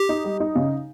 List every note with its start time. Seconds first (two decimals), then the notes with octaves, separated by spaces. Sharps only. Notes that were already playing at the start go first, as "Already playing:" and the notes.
Already playing: G4
0.09 D#4
0.24 G3
0.40 D#4
0.55 C#3